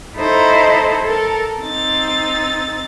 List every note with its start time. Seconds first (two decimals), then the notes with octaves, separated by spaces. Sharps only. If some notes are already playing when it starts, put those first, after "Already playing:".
0.17 D#4 E4 A4 C5 D#5
1.03 A4 A#4
1.61 C4 D#4 A6